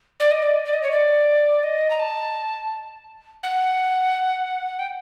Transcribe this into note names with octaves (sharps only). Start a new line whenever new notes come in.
D5
D#5
D5
D5
D#5
C#5
D5
D#5
A#5
A5
F#5
G5